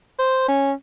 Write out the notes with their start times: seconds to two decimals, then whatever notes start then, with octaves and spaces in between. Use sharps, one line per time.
0.19 C5
0.48 C#4